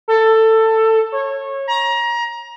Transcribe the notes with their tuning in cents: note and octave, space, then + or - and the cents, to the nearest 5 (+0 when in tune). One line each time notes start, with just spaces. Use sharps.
A4 +15
C#5 -20
A#5 +25